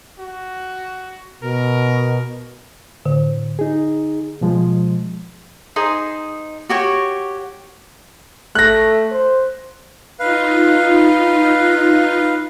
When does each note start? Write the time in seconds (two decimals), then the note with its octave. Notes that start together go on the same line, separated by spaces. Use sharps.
0.19 F#4
1.43 B2 A#4
3.06 A2 D3
3.59 D#4 G#4
4.41 B2 F3 G#3
5.76 D#4 G#4 C5
6.69 F#4 G4 C#5
8.55 A3 F#6 A#6
9.11 C5
10.19 D#4 F4 B4 F5